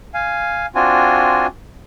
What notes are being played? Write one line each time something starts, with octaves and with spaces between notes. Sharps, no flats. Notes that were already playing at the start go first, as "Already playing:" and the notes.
F5 G#5
C4 D4 F4 F#4 G#5